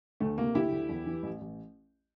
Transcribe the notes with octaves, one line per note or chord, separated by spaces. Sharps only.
D2 A3
C3 A#3
D2 E4 G4
D2
E2
E3
A1
A1